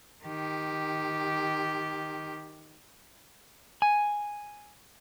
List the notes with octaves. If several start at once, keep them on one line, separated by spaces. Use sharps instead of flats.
D#3 G4
G#5